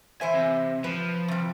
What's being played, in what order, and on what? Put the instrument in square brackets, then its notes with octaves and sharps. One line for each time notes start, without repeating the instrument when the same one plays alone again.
[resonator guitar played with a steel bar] E3 C5 E5 [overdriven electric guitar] G#5
[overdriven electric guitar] C3
[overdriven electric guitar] F3 [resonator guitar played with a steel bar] B4
[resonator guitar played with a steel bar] C3 G3